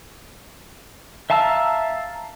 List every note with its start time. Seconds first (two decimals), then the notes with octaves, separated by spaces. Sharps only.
1.30 E5 F5 A5 A#5 E6